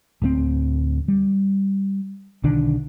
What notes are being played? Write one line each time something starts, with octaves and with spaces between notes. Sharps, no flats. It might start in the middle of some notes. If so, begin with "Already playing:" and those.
D1 D2 G3 C4
G3
B1 D3 D#3 D4